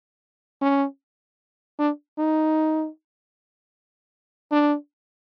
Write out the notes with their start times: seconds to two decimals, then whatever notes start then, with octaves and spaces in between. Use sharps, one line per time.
0.61 C#4
1.78 D4
2.18 D#4
4.51 D4